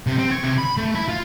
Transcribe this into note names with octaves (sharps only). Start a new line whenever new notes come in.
C3
C4
C#5
C3
B5
A3
E4
F4